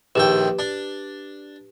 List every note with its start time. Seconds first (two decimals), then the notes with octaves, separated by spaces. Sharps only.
0.15 A#1 D#2 G4 B4 G5
0.59 D4